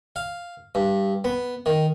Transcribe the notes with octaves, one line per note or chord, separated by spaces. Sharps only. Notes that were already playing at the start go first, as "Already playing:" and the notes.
F5
G2
B3
D#3